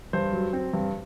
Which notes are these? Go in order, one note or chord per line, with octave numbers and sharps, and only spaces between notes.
G2 C5
F#3
C4
G2